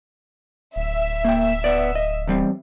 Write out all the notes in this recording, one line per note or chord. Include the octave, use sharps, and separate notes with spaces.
D1 E5
A#3 G5
B3 D5
D#5
E2 G3 C4